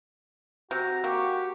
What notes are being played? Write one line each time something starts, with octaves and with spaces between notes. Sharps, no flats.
C3 F#4 A#5 G6
A#3 G4 C#6